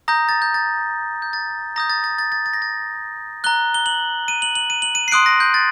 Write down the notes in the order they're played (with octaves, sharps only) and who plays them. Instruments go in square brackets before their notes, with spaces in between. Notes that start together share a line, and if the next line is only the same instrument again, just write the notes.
[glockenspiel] A#5 D#6 G6 A#6
A6
G6
A6
G6
A6
A#5 D#6 G6 A#6
A6
A6
A6
A6
A6
A#6
A6
A#5 F#6 G7
G7
F#7
D#7
F#7
F#7
D#7
F#7
D#7
C7
C6 D#6 F#6 D7
A#6
G6
A6